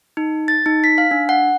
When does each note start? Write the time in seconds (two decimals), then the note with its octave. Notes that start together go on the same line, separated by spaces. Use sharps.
0.17 D#4
0.48 A6
0.66 D#4
0.84 B6
0.98 F5
1.11 D4
1.29 F#5